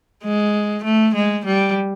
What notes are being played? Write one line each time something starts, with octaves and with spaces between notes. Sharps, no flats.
G#3
A3
G#3
G3